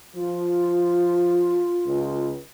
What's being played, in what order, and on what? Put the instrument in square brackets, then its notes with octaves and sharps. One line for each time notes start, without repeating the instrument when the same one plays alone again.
[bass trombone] F3 [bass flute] F4
[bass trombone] C#2